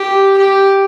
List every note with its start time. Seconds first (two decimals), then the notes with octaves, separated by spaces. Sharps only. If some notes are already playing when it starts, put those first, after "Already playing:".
Already playing: G4
0.38 G4